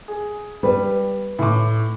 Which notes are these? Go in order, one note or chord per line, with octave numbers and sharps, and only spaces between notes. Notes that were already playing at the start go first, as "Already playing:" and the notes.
G#4
G3 B4
A2 D6